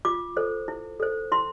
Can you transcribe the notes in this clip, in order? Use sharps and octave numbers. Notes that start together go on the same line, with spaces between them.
F4 D6
A4 C5
E4
A4 C5
E4 C6